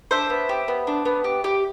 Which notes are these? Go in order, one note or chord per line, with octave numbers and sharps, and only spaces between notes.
D4 C5 E5
B3
G4
B3
D4
B3
G4
G4